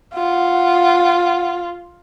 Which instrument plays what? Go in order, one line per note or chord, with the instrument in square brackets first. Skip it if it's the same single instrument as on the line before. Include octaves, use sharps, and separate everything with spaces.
[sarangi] F4 [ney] F#5